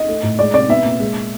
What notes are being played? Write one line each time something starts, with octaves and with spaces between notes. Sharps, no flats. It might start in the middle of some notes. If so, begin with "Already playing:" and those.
Already playing: D#5
A3
A2
G#3 D5
C3 D5
B3 E5
A#2
G#3